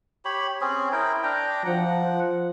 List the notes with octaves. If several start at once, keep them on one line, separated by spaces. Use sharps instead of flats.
G4 C#5 B5
C4 C#4 G#4
E4 A#4 G5
D4 G5 A#5
F3 F#5